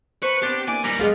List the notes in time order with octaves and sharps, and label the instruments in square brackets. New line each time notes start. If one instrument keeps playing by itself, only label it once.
[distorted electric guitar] B4 [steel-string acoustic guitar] C5 A5 [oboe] C#6
[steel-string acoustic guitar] B3 C4 [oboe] D4 [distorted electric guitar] G4
[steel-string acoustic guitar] A#3 D4 E4 [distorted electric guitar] G#5 [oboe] D6
[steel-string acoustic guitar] F2 D#3 G#5 [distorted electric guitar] G3 B3 [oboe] A#5
[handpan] G#3 G#4 D#5 [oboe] F4 [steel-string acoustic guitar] B4 F5 F#5